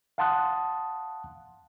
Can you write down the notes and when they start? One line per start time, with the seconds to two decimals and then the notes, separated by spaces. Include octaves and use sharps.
0.18 F5 F#5 A5 C6 D#6 F#6